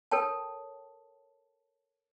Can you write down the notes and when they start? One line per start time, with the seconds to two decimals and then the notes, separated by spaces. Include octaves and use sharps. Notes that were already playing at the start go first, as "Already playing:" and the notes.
0.11 A4 A#4 C#5 G5 A5